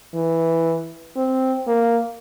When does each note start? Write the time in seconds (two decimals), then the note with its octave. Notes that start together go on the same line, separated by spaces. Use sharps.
0.14 E3
1.16 C4
1.68 A#3